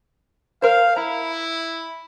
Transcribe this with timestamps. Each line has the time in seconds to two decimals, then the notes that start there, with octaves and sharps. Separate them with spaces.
0.62 A#4 C5 F5
0.96 E4 A#5